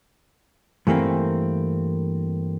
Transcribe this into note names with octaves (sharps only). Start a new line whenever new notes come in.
G2 E3 A3 A#3 C4